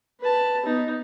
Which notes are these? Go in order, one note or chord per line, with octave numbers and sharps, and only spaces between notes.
B4 A5
B3 D#4